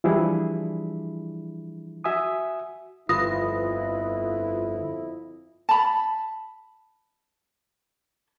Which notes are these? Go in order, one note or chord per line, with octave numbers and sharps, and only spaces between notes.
E3 F3 G3 D4 E4 G#4
F#4 E5 G#5 D#6
G1 F2 E4 F4 B4 D#6 A#6
A5 B5